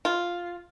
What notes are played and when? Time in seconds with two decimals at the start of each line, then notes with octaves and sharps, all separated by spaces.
0.05 F4